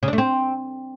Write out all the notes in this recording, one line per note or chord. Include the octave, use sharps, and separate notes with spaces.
C#3
D4
A3
C4